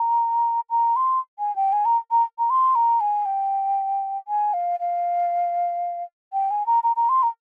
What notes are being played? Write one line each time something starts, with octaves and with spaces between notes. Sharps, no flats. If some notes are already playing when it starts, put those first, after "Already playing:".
Already playing: A#5
A#5
C6
G#5
G5
G#5
A#5
A#5
A#5
C6
A#5
G#5
G5
G#5
F5
F5
G5
G#5
A#5
A#5
A#5
C6
A#5